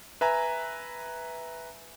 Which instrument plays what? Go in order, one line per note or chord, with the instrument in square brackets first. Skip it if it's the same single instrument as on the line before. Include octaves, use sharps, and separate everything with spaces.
[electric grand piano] B4 E5 G#5 A#5